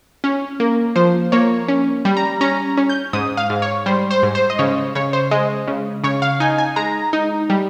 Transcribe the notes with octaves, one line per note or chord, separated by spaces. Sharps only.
C#4
A#3
F3 C5
A#3 C#5
C#4
G3
A#5
C#4 A#5
C#4
G6
G#2 D#6
F5
G#2
C#5
G3 C5
C5
G#2
C5
D#5
C#3 C#5
C#3 C#5
C5
G#3 D#5
C#3
C#3 C#5
F5
D#4 G#5
G#5
G#3 A#5
D#4
G3